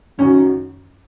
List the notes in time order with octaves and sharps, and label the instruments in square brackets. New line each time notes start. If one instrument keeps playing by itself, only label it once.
[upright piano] F#1 F#2 D#3 F#3 C#4